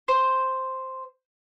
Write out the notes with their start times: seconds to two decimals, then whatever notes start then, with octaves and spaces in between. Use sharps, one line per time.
0.08 C5